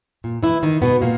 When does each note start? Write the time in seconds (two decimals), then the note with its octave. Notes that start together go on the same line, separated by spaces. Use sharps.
0.24 A#2
0.43 E3 E4
0.63 D#3 D#4
0.82 B2 B3
1.02 A#2 A#3